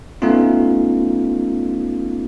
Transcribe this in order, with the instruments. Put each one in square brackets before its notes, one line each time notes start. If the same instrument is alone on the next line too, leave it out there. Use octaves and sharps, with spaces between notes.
[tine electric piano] A3 B3 C#4 D#4 F4